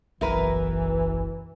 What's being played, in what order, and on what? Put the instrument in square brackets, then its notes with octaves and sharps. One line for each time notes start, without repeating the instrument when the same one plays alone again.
[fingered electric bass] F#1 B1 [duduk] E3 [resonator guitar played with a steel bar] E4 A#4 B4